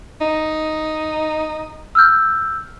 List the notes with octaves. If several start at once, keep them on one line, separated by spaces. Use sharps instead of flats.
D#4
E6 F6 G6